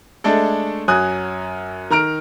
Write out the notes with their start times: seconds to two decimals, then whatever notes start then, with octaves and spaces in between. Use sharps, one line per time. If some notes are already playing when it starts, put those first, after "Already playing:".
0.24 G#3 A3 D4 A4
0.88 F#2 F#3 G#5 D#6 F#6
1.90 D#3 A#5 F6 D7